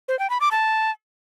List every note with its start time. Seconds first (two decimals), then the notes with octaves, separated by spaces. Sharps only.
0.08 C5
0.19 G5
0.30 B5
0.41 D6
0.51 A5